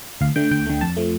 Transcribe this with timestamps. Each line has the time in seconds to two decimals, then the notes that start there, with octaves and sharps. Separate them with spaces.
0.21 D2 F5
0.36 D3 A3 G5
0.51 D2 G5
0.66 D3 A3
0.81 F2 A5
0.97 F3 A3